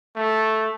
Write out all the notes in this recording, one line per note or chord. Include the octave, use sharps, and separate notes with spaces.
A3